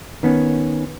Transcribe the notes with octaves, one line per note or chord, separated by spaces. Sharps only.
D#3 B3 C#4